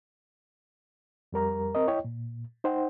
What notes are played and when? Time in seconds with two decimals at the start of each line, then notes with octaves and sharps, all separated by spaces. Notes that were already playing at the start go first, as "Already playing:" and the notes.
1.33 F2 G3 A#4 A#5
1.75 C4 A#4 D#5
1.88 E4 C#5 D#5 G5
2.05 A#2
2.64 D#4 C5 F#5 G5